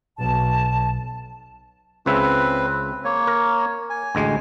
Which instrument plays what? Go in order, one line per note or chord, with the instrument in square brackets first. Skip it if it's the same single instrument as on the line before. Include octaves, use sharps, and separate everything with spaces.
[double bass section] B1 [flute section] A5
[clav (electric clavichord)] C#2 C#3 E5 [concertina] C4 B4
[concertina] A#3 C#5
[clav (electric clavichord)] A#4
[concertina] G#5
[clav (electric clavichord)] A1 D2 G#3